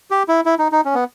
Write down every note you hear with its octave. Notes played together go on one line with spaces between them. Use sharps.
G4
E4
E4
D#4
D#4
C#4
B3